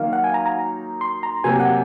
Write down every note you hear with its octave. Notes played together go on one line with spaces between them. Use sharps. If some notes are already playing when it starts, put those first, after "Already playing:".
Already playing: D#3 F#3 A#3 D#4 F5
F#5
G#5
A#5
A#5
C6
A#5
C3 F#3 A#3 G#5
F#5